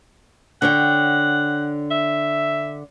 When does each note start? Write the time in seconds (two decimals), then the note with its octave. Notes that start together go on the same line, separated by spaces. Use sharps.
0.62 D3 C#5 F#5 G5
1.91 E5